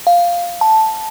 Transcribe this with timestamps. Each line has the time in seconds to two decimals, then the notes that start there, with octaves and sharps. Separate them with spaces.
0.07 F5
0.61 A5